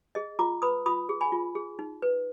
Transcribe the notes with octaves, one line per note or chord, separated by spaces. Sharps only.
G#4 D#5
F4 A#5 D6
B4 B5 D#6
F4 B5 D#6
G#4
G#5 B5
F4
G#4
D#4
B4